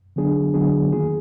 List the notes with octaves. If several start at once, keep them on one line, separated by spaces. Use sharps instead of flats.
D3 F#3 B3 D4 G#4
D3 F#3 B3 D4 G#4
D#3 A#3 F4 G#4